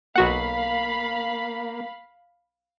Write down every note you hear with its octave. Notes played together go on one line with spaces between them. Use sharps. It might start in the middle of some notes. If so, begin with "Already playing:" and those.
B1 A#3 F#4 F5 F#5 B5